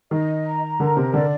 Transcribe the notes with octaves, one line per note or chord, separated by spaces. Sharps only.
D#3 D#5
A#5
D3 A#4
C3
D3 D5